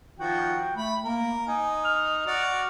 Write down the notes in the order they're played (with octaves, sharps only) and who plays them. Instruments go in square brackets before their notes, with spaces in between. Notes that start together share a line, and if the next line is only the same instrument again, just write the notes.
[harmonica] D#3 F3 F#4 [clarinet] G5
[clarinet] A3 [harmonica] B5
[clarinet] A#3 [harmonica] A#4
[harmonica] D#4 [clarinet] G#5
[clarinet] F6
[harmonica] F#4 D5